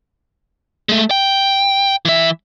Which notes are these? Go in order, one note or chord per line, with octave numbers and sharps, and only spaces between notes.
G#3 A3
G5
E3 E5